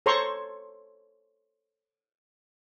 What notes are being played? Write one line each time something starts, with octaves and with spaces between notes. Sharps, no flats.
A4 C5 C#5 A#5 C6 C#6